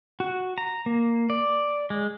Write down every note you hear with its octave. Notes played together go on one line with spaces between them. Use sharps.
F#4
A#5
A#3
D5
G#3